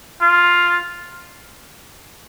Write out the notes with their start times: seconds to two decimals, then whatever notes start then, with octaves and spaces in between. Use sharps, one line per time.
0.22 F4